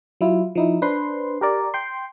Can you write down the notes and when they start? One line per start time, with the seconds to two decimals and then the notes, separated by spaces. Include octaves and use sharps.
0.21 F#3 E4 F4
0.55 F3 D#4 E4
0.82 D4 B4 C5 C6
1.41 G4 A#4 D5
1.74 G5 C6